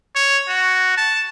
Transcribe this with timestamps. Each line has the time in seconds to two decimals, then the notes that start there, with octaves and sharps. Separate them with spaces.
0.16 C#5
0.48 F#4
0.97 A5